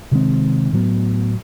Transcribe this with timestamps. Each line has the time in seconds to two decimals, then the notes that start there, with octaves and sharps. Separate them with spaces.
0.11 C3 D#3 G#3 C4
0.73 A2 F#3 B3